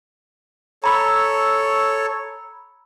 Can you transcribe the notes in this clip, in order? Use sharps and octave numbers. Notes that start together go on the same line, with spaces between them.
A4 C#5 A#5 B5 E6